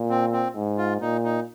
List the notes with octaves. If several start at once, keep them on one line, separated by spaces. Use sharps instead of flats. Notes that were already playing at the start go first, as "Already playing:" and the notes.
Already playing: A#2
C4
C4
G#2
F4
A#2 D#4
D#4